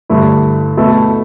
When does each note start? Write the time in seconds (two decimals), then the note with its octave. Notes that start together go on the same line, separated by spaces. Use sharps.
0.09 G2 D3 A3 E4
0.77 B2 A3 E4 A4